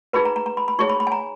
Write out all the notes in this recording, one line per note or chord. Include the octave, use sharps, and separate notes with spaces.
D#4 G#4 B4 B5
A#5
A#5
A#5
B5
B5
D#4 G#4 C#5 C#6
B5
B5
G#5
A#5